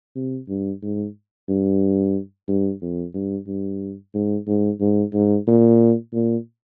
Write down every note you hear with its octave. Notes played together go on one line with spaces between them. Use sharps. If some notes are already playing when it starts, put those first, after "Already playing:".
C3
G2
G#2
G2
G2
F2
G2
G2
G#2
G#2
G#2
G#2
A#2
A#2